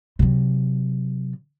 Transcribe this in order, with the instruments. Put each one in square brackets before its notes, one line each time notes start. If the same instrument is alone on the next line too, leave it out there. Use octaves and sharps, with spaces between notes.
[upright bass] C3 F#3